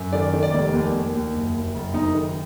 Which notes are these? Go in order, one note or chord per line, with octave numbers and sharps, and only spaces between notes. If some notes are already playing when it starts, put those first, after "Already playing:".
Already playing: F#2
D#3 D5
D#3
D5
F1
D#2
D#2
D#2
F#1
F#1
F#1
F#1 D#4
D#3